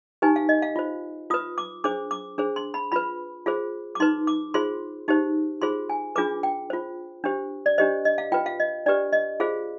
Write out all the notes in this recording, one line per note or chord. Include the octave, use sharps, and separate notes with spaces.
D#4 G4 B4 G#5
F5
D#5
F5
F4 C5
F4 B4 D#6
D6
D4 G#4 C5 D6
D6
D4 G#4 C5
C6
B5
F4 B4 B5
F4 G#4 C5
D6
D#4 B4 C6
D6
F4 G#4 C5 C6
D#4 G4 C5
F4 G#4 C5 C6
G#5
D4 F4 G#4 B4 D6
G5
F4 C5
D4 G4 C5
D5
D4 G4 C5 D#5
D#5
F5
F4 B4 G5
F5
D#5
D4 G4 B4 D5
D#5
F4 G#4 C5 F5